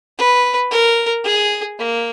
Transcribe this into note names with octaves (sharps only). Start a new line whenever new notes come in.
B4
A#4
G#4
A#3